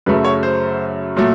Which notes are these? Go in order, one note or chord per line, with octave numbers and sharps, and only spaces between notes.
F#2 C#3 F#3 A3 B4
C#5
C5
A#2 F#3 A3